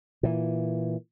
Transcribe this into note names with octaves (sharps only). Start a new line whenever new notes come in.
A#2 E3